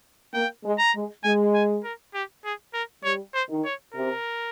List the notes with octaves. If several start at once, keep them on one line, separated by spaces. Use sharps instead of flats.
A#3 G5
G#3
A#5
G#3
G#3 G#5
G#5
A#4
G4
G#4
A#4
G3 C#5
C5
D#3
C#5
C3 A#4